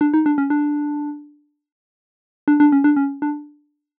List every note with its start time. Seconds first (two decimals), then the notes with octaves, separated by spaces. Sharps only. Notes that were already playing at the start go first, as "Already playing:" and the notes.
0.01 D4
0.14 D#4
0.26 D4
0.38 C#4
0.50 D4
2.48 D4
2.60 D4
2.72 C#4
2.84 D4
2.96 C#4
3.22 D4